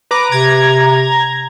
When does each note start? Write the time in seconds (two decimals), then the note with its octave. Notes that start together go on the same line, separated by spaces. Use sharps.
0.11 B4 A#5 D6
0.31 C3 A#5 G#6